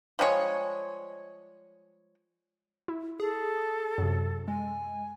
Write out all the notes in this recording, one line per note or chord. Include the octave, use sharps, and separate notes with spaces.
F3 G3 G#3 C#5
E4
G#4 A4
F#2 C3
G#3 G#5